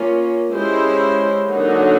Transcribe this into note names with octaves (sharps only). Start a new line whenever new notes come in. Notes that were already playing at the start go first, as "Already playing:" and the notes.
Already playing: A#3 C#4 F4
G#3 C#4 E4 G4 C5
D3 F#3 A#3 D#4 F#4